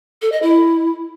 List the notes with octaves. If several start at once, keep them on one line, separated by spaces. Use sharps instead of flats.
A4
D#5
E4